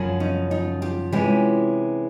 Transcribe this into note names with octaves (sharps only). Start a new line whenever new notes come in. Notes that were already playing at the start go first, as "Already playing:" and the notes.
Already playing: F#2 C#3 F3
C#4 D#4
D#4 F4
F4 G4
C3 E3 G#3 C#4 F4 G4